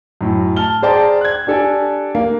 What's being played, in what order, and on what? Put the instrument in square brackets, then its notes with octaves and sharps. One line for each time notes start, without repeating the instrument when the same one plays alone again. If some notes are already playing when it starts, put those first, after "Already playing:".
[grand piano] F#2 A2
A5 F6 G7
G#4 C5 D5 G5 A5 A#5
F#6 G#6
D4 G4 A4 D5 G#5
A#3